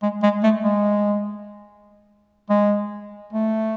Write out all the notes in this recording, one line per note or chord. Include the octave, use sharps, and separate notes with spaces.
G#3
G#3
A3
G#3
G#3
A3